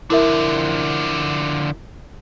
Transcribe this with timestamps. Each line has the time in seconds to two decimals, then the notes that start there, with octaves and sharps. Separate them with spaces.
0.10 D3 F3 E4 A#4 E5